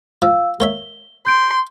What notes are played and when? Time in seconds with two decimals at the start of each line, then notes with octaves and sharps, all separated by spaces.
0.22 F3 F5 E6
0.60 A#3 C#5 E5 G7
1.27 C6 G6 D7